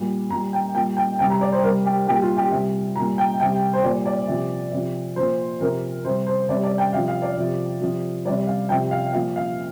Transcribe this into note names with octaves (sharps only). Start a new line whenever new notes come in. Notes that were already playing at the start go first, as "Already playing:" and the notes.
Already playing: A#2 G3
A#2 G3 A#5
G5
A#2 G3 G5
G5
C3 G3 G5
A#5
D5
C5
C3 G3 A#4
G4
A#2 G3 G4
F4
G4
C3 G3
A#2 G3 A#5
G5
C3 G3 G5
C5
A#2 G3 D5
D5
C3 F3
C3 F3
A#2 F3 C5
C3 F3 A#4
C3 G3 C5
C5
C3 G3 D5
D5
G5
C3 F3 F5
F5
D5
C3 F3
C3 F3
C3 G3 D5
F5
C3 F3 G5
F5
A#2 F3 F5
F5